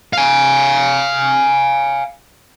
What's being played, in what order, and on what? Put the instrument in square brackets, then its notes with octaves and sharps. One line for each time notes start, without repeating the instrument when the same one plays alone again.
[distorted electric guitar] F5 G#5